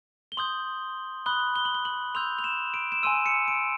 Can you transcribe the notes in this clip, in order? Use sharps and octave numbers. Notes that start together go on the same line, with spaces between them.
G7
C6 D#6 G6 F#7
B5 D#6 F#6 G7
G7
F#7
G7
F#7
C6 E6 G6 F7
F7
E7
D7
E7
G#5 C6 E6 D#7
C#7
D7